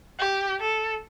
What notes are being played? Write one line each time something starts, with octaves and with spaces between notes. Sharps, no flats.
G4
A4